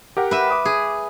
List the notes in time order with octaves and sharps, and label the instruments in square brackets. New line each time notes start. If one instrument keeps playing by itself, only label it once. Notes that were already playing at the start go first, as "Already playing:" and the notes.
[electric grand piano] G4 A#4 F#5
[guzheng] B4 E5
[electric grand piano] D6 D#6
[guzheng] G#4